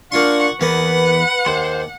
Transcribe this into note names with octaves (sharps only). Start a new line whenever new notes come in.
A#3 D4 F4 F5 F#5 C6 C#6
E2 A#3 B3 B4 F#5
D#2 C5 C6